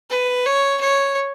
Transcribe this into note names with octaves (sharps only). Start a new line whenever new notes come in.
B4
C#5
C#5